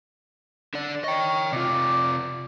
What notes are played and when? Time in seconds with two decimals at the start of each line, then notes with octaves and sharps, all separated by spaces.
0.74 D3 D5
1.04 C#5 D#5 G5
1.53 C3 F4 D5